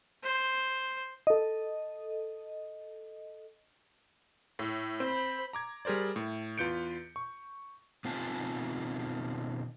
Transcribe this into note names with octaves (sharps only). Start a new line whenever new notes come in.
C5
A4 D#5
A2
C4 C5 B5
A#5 D6 G#6
G3 G#4 A#4 C5 D5
A2
E2 F4 B4 G6 C#7 D7
C#6
B2 D#3 C4 F4 G#5 A5